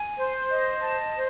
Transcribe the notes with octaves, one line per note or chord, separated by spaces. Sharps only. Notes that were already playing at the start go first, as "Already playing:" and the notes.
Already playing: G#5
C5
D#5
A5
C5